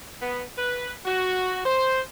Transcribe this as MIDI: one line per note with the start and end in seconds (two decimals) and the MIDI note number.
0.20 0.42 59
0.57 0.91 71
1.05 1.59 66
1.66 2.00 72